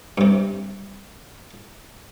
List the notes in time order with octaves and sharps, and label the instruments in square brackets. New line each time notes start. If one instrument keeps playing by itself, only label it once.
[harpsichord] G2 C3